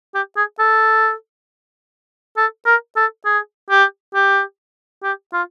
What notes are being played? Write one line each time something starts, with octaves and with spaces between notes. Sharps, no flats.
G4
G#4
A4
A4
A#4
A4
G#4
G4
G4
G4
F4